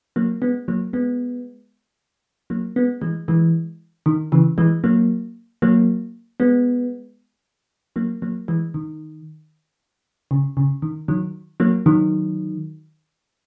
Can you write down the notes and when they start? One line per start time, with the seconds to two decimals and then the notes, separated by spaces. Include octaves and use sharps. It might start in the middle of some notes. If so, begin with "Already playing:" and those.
0.16 F#3 A#3
0.42 G#3 B3
0.68 F#3 A#3
0.93 G#3 B3
2.50 F#3 A#3
2.76 G#3 B3
3.02 E3 G#3
3.28 E3 G#3
4.06 D#3
4.32 C#3 E3
4.58 E3 G#3
4.84 F#3 A#3
5.62 F#3 A#3
6.40 G#3 B3
7.96 F#3 A#3
8.22 F#3 A#3
8.48 E3 G#3
8.74 D#3
10.31 C#3
10.57 C#3
10.82 D#3
11.08 D#3 F#3
11.60 F#3 A#3
11.86 D#3 F#3